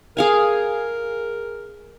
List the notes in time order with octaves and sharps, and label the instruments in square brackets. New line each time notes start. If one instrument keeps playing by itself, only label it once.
[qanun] G#4 F5 G#5 [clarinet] A#4